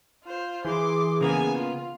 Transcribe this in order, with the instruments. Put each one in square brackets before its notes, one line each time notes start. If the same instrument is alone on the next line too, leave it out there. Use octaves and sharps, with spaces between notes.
[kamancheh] F4 C5
[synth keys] E3 [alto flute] G#4 [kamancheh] C6 D6
[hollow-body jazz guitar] C#3 A#3 B3 [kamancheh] G#5
[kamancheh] F4